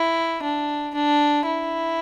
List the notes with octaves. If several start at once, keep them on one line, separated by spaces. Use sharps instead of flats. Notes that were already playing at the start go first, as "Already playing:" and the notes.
Already playing: E4
D4
D4
E4